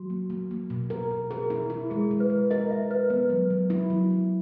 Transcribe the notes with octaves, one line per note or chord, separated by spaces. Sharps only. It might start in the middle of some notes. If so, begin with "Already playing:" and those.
Already playing: F#3 F#4
A#3
A#3
A#3
B2
A#4
B2
G#4 A#4
E4
E4
G#3 G#4
G#3
B4
G#3
A#4 D#5
G#3 E5
A#4 B4
B3 B4
F#3
F#3
E4
F#3
F#3